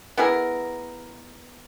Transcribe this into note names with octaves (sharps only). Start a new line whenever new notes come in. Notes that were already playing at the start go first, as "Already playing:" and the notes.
B3 E4 G#4 A#4